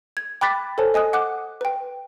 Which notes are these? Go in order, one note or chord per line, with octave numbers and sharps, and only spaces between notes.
G#6
G5 B5 D6 F#6 A6 B6
A4 C5 C#5 G#5 A5
D#5 G#5 D#6 F#6
F#5 D6 F#6
B4 G5